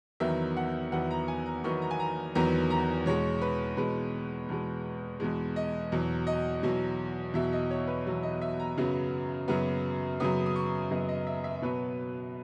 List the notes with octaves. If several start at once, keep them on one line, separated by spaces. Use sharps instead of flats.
E2 D#3 F#3 B3 E5
F#5
E2 D#3 F#3 B3 F#5
A#5
G#5
A#5
E2 D#3 F#3 B3 C#6
A#5
G#5
A#5
E2 D#3 F#3 B3 A#5
A#5
E2 B2 G#3 C#5
B4
E2 B2 G#3 B4
E2 B2 G#3
E2 B2 G#3
D#5
E2 B2 F#3
D#5
E2 B2 F#3
E2 B2 F#3 E5
D#5
C#5
B4
E2 B2 F#3
D#5
E5
A#5
F#2 C#3 F#3 B3
F#2 C#3 F#3 B3
F#2 C#3 F#3 B3 D#6
D#6
C#6
F#2 C#3 F#3 B3 D#5
D#5
E5
E5
B2 F#3 B3 B4